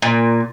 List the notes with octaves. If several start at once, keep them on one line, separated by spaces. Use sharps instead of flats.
A#2